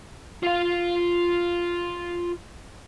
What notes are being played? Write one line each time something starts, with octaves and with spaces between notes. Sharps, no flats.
F4 F5